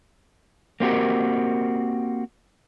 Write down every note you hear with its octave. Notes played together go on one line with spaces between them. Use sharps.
A#3 C4 F#4 G4 A#4